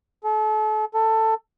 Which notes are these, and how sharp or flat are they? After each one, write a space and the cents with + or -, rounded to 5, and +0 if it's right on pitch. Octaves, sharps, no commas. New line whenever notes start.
A4 -35
A4 +15